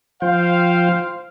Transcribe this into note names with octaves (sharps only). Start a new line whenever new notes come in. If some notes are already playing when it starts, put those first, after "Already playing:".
F3 C5 F5 G5